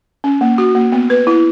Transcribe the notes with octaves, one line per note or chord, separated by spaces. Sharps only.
C#4
A#3
F#4
A#3
B3
B4
E4